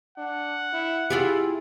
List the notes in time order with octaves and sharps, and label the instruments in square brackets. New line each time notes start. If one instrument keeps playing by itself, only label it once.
[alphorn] D4 [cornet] F#5
[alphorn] E4
[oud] E4 F4 G4 [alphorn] G#4